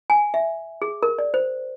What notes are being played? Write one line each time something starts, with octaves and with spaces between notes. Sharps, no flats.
G#5
E5
G#4
A#4
D5
C5